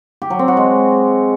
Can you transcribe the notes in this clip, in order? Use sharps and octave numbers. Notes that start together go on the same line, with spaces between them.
G4
F#3
C4
F#4
G#3